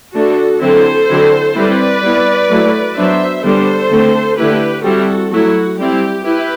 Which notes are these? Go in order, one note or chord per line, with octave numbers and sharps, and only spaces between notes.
D3 A3 D4 F#4 A4
D3 F#3 C4 E4 A4 C5
D3 F#3 C4 E4
G3 C4 E4 B4 D5
G3 B3 E4
F#3 A3 E4
F#3 B3 D4 C5 E5
D3 G3 B3 D4 A4 C5
D3 A3 C4
D3 A3 E4 G4 B4
G3 C4 E4 F#4 A4
F#3 A3 E4 F#4
G3 C4 E4 G4
E4 G4 B4